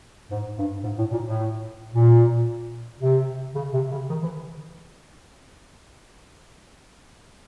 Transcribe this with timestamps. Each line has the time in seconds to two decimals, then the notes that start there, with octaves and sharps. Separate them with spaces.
0.31 G#2
0.57 G2
0.84 G#2
0.98 A2
1.12 A#2
1.25 A2
1.93 A#2
3.01 C3
3.55 C#3
3.74 C3
3.92 C#3
4.10 D#3
4.23 E3